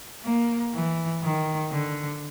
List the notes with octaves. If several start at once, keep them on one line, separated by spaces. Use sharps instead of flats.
A#3
E3
D#3
D3